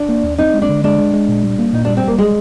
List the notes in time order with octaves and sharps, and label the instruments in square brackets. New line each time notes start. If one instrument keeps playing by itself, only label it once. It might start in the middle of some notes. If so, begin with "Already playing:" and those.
Already playing: [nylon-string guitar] D4
[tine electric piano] A#3
D#2
[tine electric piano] C4 [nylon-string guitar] D#4
[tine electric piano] G#3
[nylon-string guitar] D4
[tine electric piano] D3
[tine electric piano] G#3 [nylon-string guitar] D4
[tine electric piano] G#3
G#3
A#2
G3
A#3
[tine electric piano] A#2 [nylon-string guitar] D#4
[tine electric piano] G3 [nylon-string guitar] D4
[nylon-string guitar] C4
[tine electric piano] G3 [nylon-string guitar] A#3
[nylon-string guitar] G#3